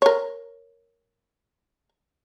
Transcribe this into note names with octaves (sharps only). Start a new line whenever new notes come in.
A#4 C#5